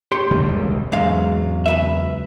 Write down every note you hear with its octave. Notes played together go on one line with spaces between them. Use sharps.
G4 C#5 C6
D3 G3 A#3
E1 C#2
E2 G#2 F#3 G#3 F5
C#2 B4 E5